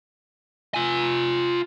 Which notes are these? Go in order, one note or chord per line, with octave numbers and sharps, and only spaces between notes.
F4 G#5